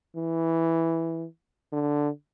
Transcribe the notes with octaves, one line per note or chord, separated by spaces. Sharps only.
E3
D3